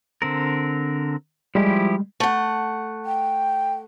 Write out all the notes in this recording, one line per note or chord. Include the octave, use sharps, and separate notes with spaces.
D3 C4 A#4
F3 G3 G#3 E4 G4
A3 F#5
G5